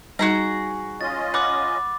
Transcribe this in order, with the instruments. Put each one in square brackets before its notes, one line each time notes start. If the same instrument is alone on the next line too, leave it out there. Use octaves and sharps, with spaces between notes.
[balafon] G3 D#4 [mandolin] F#4 G#4 A#5
[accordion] C#4 F4 D#5 [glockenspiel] A6
[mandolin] F#5 [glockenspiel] B5 D6